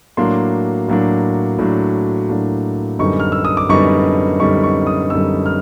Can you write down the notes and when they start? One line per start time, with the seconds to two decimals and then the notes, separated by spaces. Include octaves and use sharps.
0.17 A2 F#3 A#3 D4 C6
0.88 A2 F#3 A#3 D4
1.59 A2 F#3 A#3 D4
2.29 A2 F#3 A#3 D4
2.99 F#2 D3 G3 B3 D#4 C#6
3.20 F6
3.32 E6
3.45 D#6
3.57 D6
3.69 F#2 D3 G3 B3 D#4 C#6
4.40 F#2 D3 G3 B3 D#4 C#6
4.63 C#6
4.87 D#6
5.10 F#2 D3 G3 B3 D#4 E6
5.46 F6